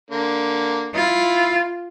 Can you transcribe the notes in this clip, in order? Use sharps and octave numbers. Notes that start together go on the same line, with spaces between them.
D3 A#3
E4 F4